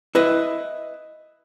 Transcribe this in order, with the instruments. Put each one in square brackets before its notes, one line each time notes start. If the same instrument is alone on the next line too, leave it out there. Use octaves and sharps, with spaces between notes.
[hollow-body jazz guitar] E4 B4 D#5